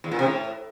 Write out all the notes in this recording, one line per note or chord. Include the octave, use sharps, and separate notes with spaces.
E2
A#2
C3
A2